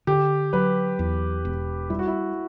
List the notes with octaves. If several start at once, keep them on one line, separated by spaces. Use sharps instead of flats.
D3 G4
F#3 B4
E2
E1
G3 E4
F#4
E4